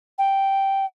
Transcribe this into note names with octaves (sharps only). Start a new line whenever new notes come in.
G5